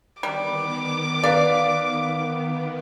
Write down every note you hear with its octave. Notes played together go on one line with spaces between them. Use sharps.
D#3 G3 B3 D6
B4 D5 F5